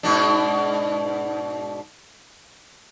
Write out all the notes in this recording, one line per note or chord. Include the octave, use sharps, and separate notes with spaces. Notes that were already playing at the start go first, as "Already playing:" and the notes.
G#2 B2 D4